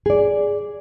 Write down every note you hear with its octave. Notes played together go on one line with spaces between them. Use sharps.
G#4 D5